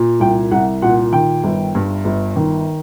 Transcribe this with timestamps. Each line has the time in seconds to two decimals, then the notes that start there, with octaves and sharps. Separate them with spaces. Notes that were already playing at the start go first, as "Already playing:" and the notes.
Already playing: A#2
0.20 C2 G5
0.51 C2 F#5
0.82 A#2 F#5
1.13 D#3 G5
1.44 G1
1.75 G2
2.05 G1
2.36 D#3